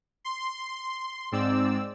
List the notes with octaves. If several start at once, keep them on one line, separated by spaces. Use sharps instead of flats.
C6
G#2 C4 D5 E6